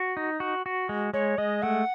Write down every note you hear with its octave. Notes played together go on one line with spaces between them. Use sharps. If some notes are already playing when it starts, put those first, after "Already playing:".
Already playing: F#4
D#4
F#4
F#4
G#3
G#3 C#5
G#3 D#5
A3 F#5